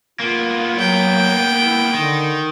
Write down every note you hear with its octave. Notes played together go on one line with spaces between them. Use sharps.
A#3 B3 F4
F#3 G5
E4
D3 D#3